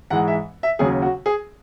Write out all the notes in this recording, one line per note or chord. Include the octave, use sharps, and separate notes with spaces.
G#2 E3 G#3 F#5
E5
E5
D#2 C#3 F#3 G#4
F#4
G#4